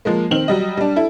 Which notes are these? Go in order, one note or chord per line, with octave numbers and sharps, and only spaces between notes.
F3 G#3 A#3
D#3 C4 F#7
F#3 G3 D#5
G3 D4
E4 A4